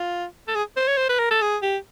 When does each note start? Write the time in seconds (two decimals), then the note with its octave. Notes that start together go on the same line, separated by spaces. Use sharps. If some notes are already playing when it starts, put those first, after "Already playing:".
Already playing: F4
0.48 A4
0.55 G#4
0.76 C5
0.87 C#5
0.97 C5
1.09 B4
1.19 A#4
1.31 A4
1.42 G#4
1.62 G4